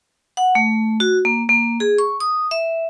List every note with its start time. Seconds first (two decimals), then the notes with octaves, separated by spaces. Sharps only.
0.37 F#5
0.55 A3
1.00 F#4
1.25 A#3
1.49 A#3
1.80 G#4
1.98 C#6
2.20 D#6
2.51 E5